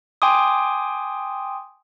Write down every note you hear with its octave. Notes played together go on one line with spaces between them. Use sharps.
G5 G#5 C6 D6 D#6